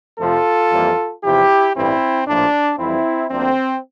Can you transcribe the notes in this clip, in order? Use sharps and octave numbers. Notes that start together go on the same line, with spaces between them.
F2 C3 F3 A3 F4 A4
F2 E3 G3 A#3
E2 C3 F3 E4 G4
A1 G2 E3 G3 C4 E4
A#1 A2 F3 A#3 D4
F2 E3 G3 C4 E4
D2 D3 F3 A#3 C4